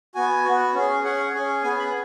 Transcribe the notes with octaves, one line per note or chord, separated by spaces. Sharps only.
B3 F#4 G#5
B3 F#4
C#4 G#4
C#4 G#4 F#5
C#4 G#4
B3 G#4 G#5
B5